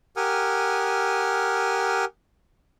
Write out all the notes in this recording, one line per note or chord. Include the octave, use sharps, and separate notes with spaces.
G4 A#4 F#5 G#5 D#6 F6